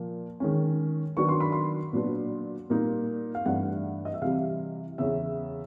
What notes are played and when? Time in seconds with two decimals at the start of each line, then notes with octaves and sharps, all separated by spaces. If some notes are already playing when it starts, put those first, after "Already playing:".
Already playing: A#2 F3 A#3
0.40 D#3 G#3 C#4
1.17 D#3 F#3 B3 D4 C#6
1.29 C6
1.40 B5
1.52 C6
1.93 A#2 F#3 B3 D4
2.70 A#2 G3 A#3 D#4
3.35 F5
3.46 G2 E3 A3 D4 F#5
4.05 D#5
4.14 E5
4.22 C3 E3 G3 F5
4.98 E2 C#3 E3 E5